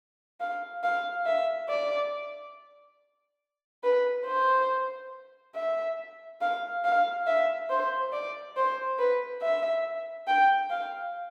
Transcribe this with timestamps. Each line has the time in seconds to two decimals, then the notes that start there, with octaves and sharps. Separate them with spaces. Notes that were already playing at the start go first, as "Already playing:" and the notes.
0.40 F5
0.83 F5
1.26 E5
1.69 D5
3.84 B4
4.27 C5
5.55 E5
6.41 F5
6.85 F5
7.27 E5
7.70 C5
8.13 D5
8.56 C5
8.99 B4
9.42 E5
10.27 G5
10.70 F5